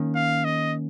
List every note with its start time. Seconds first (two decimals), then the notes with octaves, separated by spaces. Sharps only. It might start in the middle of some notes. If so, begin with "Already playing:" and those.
Already playing: D#3 A#3 C#4
0.15 F5
0.45 D#5